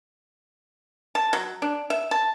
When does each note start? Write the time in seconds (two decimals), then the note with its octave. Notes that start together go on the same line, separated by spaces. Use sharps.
1.15 A5
1.33 F#3
1.62 D4
1.90 E5
2.11 A5